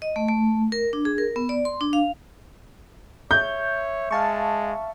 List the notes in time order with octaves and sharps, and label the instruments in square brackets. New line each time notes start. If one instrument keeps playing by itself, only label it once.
[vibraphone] D#5
A3
A3
A#4
D4
G#4
A#4
B3
D5
C6
D4
F5
[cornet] C#5 [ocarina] E5 [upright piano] G6
[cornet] G#3 [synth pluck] F5 A5 C#6